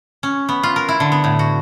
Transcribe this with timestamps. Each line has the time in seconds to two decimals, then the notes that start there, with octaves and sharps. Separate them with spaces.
0.23 C#4
0.49 B3
0.63 F4
0.76 A#4
0.89 E4
1.00 D3
1.12 B3
1.24 A2
1.39 F#4